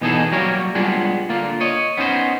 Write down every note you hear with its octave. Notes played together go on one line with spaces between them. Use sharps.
B2 E3 B3 D#4 G#4 A4
F#3 G3 A#3 G4 A#4 C#5
G3 G#3 B3 D4 F4 G#4
D3 A#3 F4
C#5 D#5
B3 C#4 D#4 C5